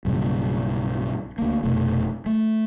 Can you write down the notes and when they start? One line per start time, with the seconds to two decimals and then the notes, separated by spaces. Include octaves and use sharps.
0.05 B1 G2 A#2 C#3
1.38 D2 A#3
1.63 F1 B2 A3
2.26 A3